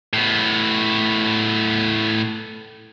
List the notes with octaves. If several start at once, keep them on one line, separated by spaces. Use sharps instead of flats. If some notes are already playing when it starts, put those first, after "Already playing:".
A2 B3